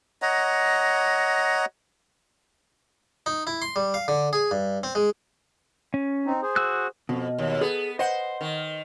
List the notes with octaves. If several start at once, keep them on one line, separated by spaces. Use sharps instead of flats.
C#5 D#5 F#5 A#5
D#4
E4
C6
G3
F5
D3
G#4
G2
C4
G#3
C#4
C4 D#4
G#4 C5
F#4 E6 F#6
F2 B2
D#2
B3 G#4 A4
C5 D#5 F#5
D#3